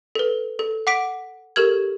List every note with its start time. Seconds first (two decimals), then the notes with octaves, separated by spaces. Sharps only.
0.15 A4 B4
0.59 A4
0.87 F#5 D6 B6 D7
1.56 G4 A4 A#4 F6 G#6